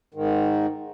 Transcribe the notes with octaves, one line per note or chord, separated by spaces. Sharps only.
G#2 D#3